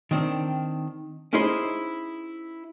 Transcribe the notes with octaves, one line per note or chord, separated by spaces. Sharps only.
D#3 C4 D4
C#4 D#4 E4 G#4 C5 D#5